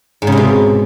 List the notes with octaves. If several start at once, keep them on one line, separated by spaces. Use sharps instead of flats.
G#2
C#3
C3
B2